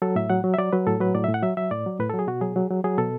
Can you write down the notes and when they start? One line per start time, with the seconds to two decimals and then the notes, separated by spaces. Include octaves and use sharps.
0.02 F#3 A4
0.16 A2 E5
0.30 F#3 F#5
0.44 F#3
0.54 E5
0.58 F#3 D5
0.73 F#3 B4
0.87 A2 A4
1.00 F#3 B4
1.15 A2 D5
1.24 E5
1.29 A2
1.34 F#5
1.42 F#3 E5
1.57 F#3 E5
1.71 A2 D5
1.86 F#3
1.99 A2 B4
2.10 A4
2.14 F#3
2.19 G#4
2.27 B2 F#4
2.41 F#3 G#4
2.56 F#3
2.70 F#3
2.84 F#3 G#4
2.98 B2 A4